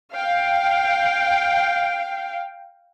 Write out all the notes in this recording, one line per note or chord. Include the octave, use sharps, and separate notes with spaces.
F5 G5